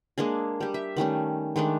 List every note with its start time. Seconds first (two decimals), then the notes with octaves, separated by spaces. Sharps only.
0.18 G#3 A#3 D4 G#4
0.61 G3 G4
0.74 E5
0.97 D#3 G3 A3 C#4
1.56 D#3 G#3 A3 D4